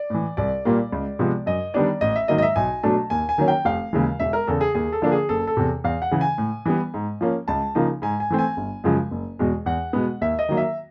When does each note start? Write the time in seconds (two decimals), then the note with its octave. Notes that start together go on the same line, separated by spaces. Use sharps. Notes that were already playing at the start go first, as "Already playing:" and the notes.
Already playing: D5
0.10 A2 E3
0.37 C2 D5
0.65 A#2 G3 A#3
0.93 C#2
1.19 C3 F3 G#3 B3
1.46 F#2 D#5
1.74 D#3 G3 B3 D4 D5
2.01 A1 D#5
2.16 E5
2.28 G#2 D#3 F#3 A#3 D#5
2.38 D#5
2.42 E5
2.56 B1 G#5
2.83 B2 F#3 A3 D4 A5
3.10 D#2 G#5
3.29 G#5
3.38 D#3 F#3 A#3 C#4
3.48 G5
3.65 F1 F5
3.93 D#2 C#3 E3 G#3
4.20 E1 E5
4.33 A#4
4.47 E2 C#3 A4
4.61 G#4
4.75 D#2 G#4
4.93 A4
5.02 D3 F3 A#3 D4
5.12 G#4
5.29 F#1 A4
5.47 A4
5.57 E2 C3
5.84 E2 F5
6.02 F#5
6.11 C#3 E3
6.21 G#5
6.38 A2
6.66 E3 G3 B3
6.94 G#2
7.21 F3 A#3 C#4
7.48 C#2 A5
7.75 C#3 F3 A#3 D#4
8.02 G#2 G#5
8.20 G#5
8.30 E3 A3 C4
8.39 G#5
8.57 G1
8.84 F#2 C#3 F3 G#3
9.11 F#1
9.39 E2 B2 G#3
9.66 E2 F#5
9.93 B2 G#3 B3
10.21 D#2 E5
10.39 D#5
10.49 D#3 F#3 A#3
10.57 E5